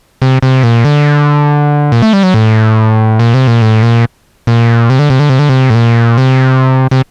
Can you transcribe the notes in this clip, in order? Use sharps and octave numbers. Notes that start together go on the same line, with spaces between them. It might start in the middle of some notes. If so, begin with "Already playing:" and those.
C3
C3
A#2
D3
A#2
A3
G3
F#3
A2
A#2
C3
A#2
A2
A#2
A#2
C3
D3
C3
D3
C3
D3
C3
A2
A#2
C3
C3